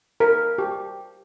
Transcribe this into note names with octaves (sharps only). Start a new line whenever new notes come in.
A#4
G4